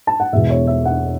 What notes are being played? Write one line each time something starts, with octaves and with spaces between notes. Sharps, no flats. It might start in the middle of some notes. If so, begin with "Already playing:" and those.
A5
F#5
E1 E2 B2 E5
C#5
E5
F#5